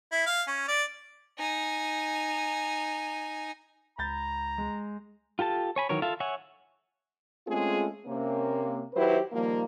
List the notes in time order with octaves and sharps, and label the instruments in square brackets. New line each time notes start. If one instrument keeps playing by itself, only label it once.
[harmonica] E4
F5
C#4
D5
[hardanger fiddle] D#4 G#5
[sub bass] C#2 [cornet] A#5 [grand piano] B5 G6 A6
[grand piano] G#3
[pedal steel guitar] F4 G4 A4 A5
C#5 G#5 B5
D#3 E3 F#3 A#4 C#5
F4 A4 E5 F5
C#5 E5 F#5 G#5
[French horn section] G#3 A3 C4 C#4 F4 G#4
C3 A#3 C#4
D#3 F#3 E4 G4 B4 C5
D#3 F3 G3 A#3